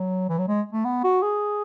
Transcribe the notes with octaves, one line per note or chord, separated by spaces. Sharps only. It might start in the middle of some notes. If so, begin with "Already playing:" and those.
Already playing: F#3
E3
F#3
G#3
A3
B3
F#4
G#4